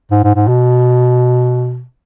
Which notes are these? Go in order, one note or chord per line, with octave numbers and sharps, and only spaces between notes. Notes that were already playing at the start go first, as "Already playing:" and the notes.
G#2
G#2
G#2
B2